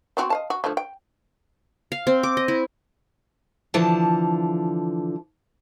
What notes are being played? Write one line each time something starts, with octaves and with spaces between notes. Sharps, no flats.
B3 C4 F#4
D#5 F5 A5
F#4
D3 F3 A3
G5
F5
C4
D6
D#5
E4
D3 E3 F3 A5